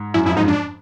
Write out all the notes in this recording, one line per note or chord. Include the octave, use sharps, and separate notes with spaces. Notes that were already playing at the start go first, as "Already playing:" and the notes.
Already playing: G#2
F#2 E4
F2 E4
G#2 D#4
D4